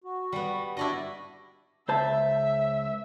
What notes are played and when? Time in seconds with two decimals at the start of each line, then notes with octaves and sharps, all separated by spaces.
0.04 F#4
0.32 G3 B3
0.77 D4 E4 F#4 D5 D#5
1.88 C#2 C5 E5 A5